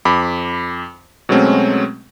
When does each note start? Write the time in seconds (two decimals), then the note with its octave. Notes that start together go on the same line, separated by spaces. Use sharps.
0.05 F2 B5 D6
1.29 B2 F#3 G#3 A3 C4 C#4